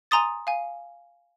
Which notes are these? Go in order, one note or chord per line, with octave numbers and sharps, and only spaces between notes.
G#5 A#5 C6 D#6 A6
F5 G#5